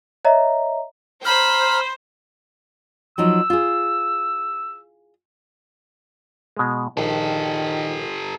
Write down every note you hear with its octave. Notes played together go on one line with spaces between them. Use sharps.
C#5 D#5 E5 A#5
C5 A#5 B5 F6
F3 F#3 D#4 E6
F4 G#4
B2 G#3
A#1 D#3 G4 A4